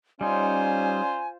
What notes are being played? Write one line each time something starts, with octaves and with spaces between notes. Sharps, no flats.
G3 C#4 D#4 F4 C5 D5 G#5